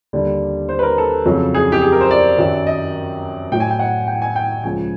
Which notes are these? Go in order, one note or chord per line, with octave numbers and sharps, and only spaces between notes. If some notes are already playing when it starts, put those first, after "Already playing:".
D#2 D3 G3
C5
B4
A#4
A4
F2 C#3 F#3
G#4
G4
G#4
A#4
C5
D5
F#2 D#3 F#3
D#5
A2 F#3 G5
G#5
G5
F#5
G5
G#5
G5
C#2 C#3 F3 G#5